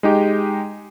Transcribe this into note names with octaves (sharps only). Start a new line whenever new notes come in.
G#3 D#4 G4